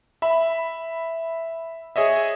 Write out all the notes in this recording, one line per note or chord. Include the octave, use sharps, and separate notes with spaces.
E5 B5
G#4 C#5 D#5 E5